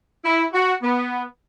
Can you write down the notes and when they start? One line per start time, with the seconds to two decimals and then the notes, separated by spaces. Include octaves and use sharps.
0.25 E4
0.53 F#4
0.82 B3